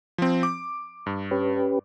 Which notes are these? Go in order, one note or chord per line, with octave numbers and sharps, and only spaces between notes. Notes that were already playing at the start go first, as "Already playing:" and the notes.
F3 C4
D6
G2
C#4 G4 B4